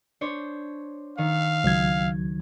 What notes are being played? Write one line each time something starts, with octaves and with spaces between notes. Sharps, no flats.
D4 C5 C#5
D#3 F5
C#2 F#3 G#6